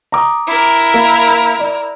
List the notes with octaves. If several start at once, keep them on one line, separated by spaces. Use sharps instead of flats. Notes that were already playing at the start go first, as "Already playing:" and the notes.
A#5 D6 D#6
E4 A#4
A#3
D5